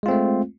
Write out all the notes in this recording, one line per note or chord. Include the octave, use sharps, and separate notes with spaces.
G#3 A3 C4 F4